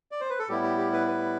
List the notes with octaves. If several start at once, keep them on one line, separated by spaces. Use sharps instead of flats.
D5
C5
B4
A4
A2 G3 B3 E4 G4
G4
G4
B4
B4